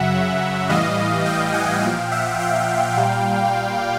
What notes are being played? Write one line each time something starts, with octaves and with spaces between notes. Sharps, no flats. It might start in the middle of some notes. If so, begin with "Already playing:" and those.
Already playing: F#2 C#3 F#3 E5 F#5
A2 E3 G3 D#5 F5
F5 G5
F#5 G#5
A#2 F3 F5 G5
E5 F#5
F5 G5
A#2 G3